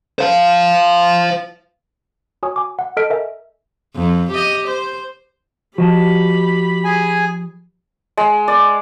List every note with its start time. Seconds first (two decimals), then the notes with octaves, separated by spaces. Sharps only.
0.19 C5 F5
2.43 F#4 C#5 G#5 D#6
2.56 G#5 D6
2.79 F#5
2.97 A4 D#5 A5 F6 B6 D7
3.10 A#4 D#5 E5 G#5
3.95 F2
4.31 G4 D#5
4.67 C5
5.78 F3 F#4 G4 D#5 A5 B5
6.85 G#4 G#5
8.17 G#3
8.48 D5